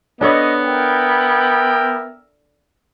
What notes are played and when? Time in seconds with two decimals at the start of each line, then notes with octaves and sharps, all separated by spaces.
0.21 B3 D4 A4 C#5 D#5
0.64 A#4 E5 G5